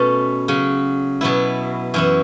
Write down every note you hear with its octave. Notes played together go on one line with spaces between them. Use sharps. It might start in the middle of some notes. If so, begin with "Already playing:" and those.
Already playing: B2 A3 C#4
C#3 F#3 C#4
B2 F#3 B3 E4
F#2 E3 C#4 E4